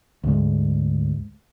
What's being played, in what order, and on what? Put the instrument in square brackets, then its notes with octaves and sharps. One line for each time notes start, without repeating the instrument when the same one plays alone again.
[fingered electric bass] D2 G#2 G#3